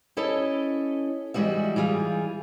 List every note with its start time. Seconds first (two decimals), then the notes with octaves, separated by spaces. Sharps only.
0.17 C#4 E4 A4 C#5 D#5
1.34 E3 G3 G#3 F#4 E5
1.76 E3 G3 F4 G#4